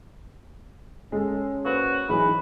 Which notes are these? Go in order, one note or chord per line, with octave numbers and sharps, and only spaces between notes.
G#3 C#4 A4
A#3 F#4 B4 C5
E3 F#3 D#4 G#4 B4